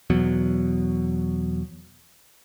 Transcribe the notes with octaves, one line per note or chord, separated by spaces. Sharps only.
E2 B2 F#3